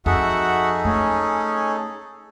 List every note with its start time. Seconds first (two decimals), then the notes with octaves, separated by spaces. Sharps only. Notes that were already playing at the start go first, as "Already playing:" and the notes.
0.06 F2 D#4 F#4 G#4 A4 E5 F#5
0.85 A3 C#4